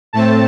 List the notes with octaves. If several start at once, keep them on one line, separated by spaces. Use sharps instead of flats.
A2 A3 C4 A5